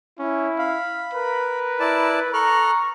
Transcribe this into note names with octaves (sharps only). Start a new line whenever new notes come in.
C#4 E4
F5 B5
A#4 B4
E4 D5 A5
A4 A#5 C#6 F6 F#6